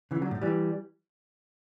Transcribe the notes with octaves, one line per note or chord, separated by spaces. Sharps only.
C#3 E3
D3 F#3
A2
E3 G3